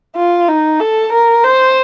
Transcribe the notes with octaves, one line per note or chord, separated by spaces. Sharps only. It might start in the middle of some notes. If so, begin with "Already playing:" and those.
F4
D#4
A4
A#4
C5